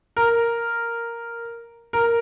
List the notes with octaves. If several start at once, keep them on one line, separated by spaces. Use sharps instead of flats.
A#4
A#4